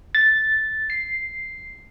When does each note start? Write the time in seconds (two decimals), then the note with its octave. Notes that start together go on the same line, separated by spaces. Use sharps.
0.15 A6
0.90 C7